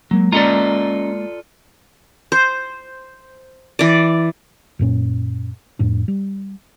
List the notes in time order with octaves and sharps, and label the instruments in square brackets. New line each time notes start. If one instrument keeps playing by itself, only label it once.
[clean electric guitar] F#3 [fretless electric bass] G#3 A#3
[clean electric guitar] C#4 D#5 A#5 [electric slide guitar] F4 A4 D5
[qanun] C5
E3 D5
[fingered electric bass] F#2 A#2 C#4
F2 A2 D4
G3